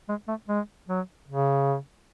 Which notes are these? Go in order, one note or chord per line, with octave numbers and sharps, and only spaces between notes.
G#3
A3
G#3
F#3
C#3